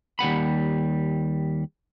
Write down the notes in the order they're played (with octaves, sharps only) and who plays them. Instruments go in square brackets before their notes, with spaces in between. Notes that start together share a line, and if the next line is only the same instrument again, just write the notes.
[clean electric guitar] D#2 G3 F#5 B5